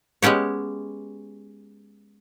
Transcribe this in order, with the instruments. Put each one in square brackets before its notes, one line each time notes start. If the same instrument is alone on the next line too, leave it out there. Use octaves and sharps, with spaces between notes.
[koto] G#3 B3 C#4 G4 C#5